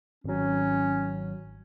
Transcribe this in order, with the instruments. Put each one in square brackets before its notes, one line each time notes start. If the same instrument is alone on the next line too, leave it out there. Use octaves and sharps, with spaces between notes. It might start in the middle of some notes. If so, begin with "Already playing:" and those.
[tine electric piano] G#1 F#3 [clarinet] C#4